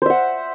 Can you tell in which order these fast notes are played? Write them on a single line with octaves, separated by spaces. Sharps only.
C5 E5 F#5